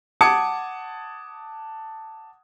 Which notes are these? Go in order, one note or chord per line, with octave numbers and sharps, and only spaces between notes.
F#5 A5 D6 D#6 G#6 C#7